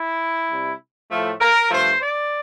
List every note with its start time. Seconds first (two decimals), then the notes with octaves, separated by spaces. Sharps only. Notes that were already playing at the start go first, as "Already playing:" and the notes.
Already playing: E4
0.51 C3 G3
1.11 A2 F3 A3
1.41 A#4
1.71 G2 F3 A3 C5
2.01 D5